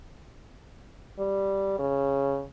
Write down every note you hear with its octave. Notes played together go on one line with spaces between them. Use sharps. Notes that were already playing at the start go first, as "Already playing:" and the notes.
G3
C#3